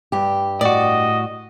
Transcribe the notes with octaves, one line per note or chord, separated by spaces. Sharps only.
G2 G4
A2 F#4 D5 D#5